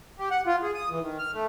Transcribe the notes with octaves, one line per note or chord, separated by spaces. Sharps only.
G4
F#5
F4
G#4
D#6
E3
D#3
F6
A3